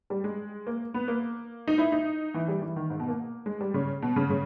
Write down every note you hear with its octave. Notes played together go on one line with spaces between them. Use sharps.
G3
G#3
A#3
B3
A#3
D#4
E4
D#4
E3
G3
E3
D#3
G#2
B2
A#3
G#3
G3
C#3
B2
C#3
C#3